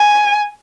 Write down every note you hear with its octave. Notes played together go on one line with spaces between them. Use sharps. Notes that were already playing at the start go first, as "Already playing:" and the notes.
Already playing: G#5